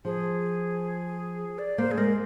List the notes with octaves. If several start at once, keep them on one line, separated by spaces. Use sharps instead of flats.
F3 G#4
D5
A#3 C5
G#4
G#3 A#4